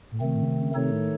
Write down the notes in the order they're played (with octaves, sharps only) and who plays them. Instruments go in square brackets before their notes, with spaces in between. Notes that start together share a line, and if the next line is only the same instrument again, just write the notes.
[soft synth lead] A2
[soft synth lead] C3 [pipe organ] D#3 A3 C4
[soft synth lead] A2
C#3
C3
C#3
[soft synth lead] C3 [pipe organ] D#3 A3 D#4 A4 C#5
[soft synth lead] A2